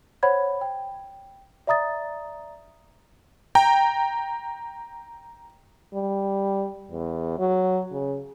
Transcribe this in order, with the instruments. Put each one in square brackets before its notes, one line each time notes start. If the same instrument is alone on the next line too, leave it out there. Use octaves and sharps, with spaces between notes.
[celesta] C5 C#5 F#5 B5 G#6
G5
D5 E5 A#5 D#6 A6
[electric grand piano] G5 A#5
[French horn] G3
E2
F#3
C#3